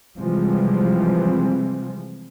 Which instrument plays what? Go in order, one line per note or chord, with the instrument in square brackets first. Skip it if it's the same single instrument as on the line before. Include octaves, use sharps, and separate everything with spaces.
[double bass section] C3 E3 F3 G3 G#3 C4